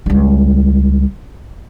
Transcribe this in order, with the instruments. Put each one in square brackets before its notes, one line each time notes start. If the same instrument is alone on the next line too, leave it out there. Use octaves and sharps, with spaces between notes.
[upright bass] C#2 G3